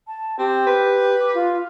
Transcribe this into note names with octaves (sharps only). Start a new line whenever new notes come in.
A5
C4 G4
B4
D6
F4